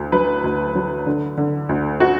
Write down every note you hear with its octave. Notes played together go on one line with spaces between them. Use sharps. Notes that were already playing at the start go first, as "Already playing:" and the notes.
Already playing: D2 D3
F#3 B4
D2
F#3
D3
D3
D2
F#4